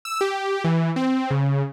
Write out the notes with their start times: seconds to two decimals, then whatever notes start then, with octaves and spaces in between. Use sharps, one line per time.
0.05 E6
0.21 G4
0.64 E3
0.96 C4
1.30 C#3